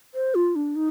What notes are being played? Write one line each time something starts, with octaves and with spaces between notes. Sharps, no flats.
C5
F4
D4
D#4